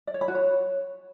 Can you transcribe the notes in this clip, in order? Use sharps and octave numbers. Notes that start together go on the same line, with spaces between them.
D5
C#5
B5
F#4
C#5